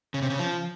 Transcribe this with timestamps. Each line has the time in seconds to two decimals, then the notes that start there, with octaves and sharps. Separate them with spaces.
0.14 C#3
0.22 C3
0.30 C#3
0.38 F3